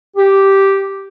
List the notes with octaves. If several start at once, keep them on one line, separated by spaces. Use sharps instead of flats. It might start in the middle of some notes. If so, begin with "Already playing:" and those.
G4